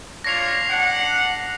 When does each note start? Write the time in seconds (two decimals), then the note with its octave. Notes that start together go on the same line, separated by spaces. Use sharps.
0.24 D4 F4 C#5 A#6 C7 F7
0.69 D4 F#5